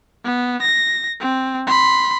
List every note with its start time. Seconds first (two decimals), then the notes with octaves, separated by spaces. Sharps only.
0.24 B3
0.62 A#6
1.20 C4
1.67 B5 C6